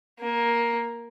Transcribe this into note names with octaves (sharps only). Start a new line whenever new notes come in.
A#3